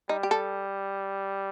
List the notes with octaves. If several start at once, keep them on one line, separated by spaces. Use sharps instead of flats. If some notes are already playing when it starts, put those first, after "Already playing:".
G3 D#4
G4
A4